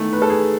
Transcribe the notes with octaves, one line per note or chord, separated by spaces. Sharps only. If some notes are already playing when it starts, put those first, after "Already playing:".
Already playing: E2 D#3 A3
B4
A4
G#4